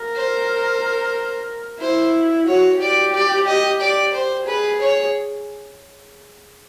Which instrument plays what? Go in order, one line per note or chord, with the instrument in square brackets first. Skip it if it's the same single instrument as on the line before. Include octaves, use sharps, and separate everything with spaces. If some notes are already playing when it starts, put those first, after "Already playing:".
Already playing: [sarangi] A#4
[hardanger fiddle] C5
[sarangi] E4 [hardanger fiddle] C5
[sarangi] F#4 [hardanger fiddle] C#5
[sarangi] G4 [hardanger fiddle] D5
[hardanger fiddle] D5
D#5
D5
C5
[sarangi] G#4 [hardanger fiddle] B4
[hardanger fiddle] C#5